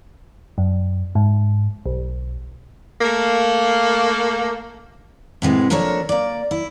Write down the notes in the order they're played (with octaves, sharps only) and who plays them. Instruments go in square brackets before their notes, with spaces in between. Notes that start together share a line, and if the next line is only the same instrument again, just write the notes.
[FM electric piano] F#2
G#2
B1
[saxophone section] A3 A#3
[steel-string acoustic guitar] A2 C3 G#3 B3
F3 A#3 D4 A4 A#4 C#5
A#3 D5
E4